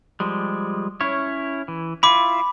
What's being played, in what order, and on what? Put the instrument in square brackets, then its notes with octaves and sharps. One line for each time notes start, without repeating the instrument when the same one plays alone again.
[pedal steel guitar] F3 G3 G#3
C#4 E4 C#5
E3
[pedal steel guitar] E4 F4 [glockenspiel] B5 D6